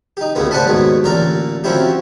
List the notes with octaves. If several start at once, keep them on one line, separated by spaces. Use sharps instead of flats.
D#4 G4
D2 A2 C#3 A#3 B3
C5 D5 F#5 G#5 A5 B5
D#2 G#2 B2 F#3 B3
A1 A#2 D3 A#4 D5 A#5
F3 F#3 C4 C#4 E4 G4